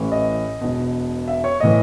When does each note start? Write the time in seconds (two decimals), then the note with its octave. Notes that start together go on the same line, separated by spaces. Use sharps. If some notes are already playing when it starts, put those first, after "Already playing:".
Already playing: A1 A2 E3
0.12 D#5
0.61 E1 E2 B2
1.28 E5
1.44 C#5
1.60 A2 E3 D#5